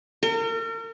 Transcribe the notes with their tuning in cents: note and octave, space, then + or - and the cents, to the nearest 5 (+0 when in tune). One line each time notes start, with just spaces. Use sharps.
A#4 -40